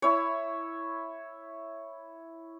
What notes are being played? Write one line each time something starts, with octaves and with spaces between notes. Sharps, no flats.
E4 C#5